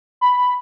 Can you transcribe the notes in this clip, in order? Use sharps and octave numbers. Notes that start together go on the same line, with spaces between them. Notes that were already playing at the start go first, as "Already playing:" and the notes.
B5